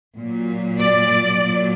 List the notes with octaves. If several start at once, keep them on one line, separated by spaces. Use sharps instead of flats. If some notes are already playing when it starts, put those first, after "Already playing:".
A#2 F#3
D5
A#2 F#3